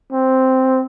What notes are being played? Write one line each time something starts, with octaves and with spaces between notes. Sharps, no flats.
C4